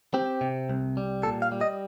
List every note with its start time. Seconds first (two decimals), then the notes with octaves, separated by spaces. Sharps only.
0.14 C4 G4
0.41 C3
0.69 C2
0.97 G3
1.23 A#2 A4
1.42 F5
1.52 G3
1.61 D#5